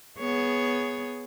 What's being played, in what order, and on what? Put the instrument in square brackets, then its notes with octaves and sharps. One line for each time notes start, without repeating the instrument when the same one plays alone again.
[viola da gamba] B3 G#4 C#5